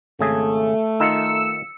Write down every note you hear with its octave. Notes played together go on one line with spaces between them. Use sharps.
G#1 C#3 A3 G#4
D#3 D#4 F4 E6 C#7